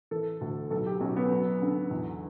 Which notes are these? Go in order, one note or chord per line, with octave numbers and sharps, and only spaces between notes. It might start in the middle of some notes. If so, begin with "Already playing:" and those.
E3 A4
D2
B1 A4
G4
B1 C#4
B3
F#3
D3
E2